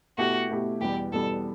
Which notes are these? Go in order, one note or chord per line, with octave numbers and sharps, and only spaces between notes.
B2 A3 E4 F#4 G4
B2 A3 E4 G4
E2 B2 G3 G4
E2 B2 G3 A4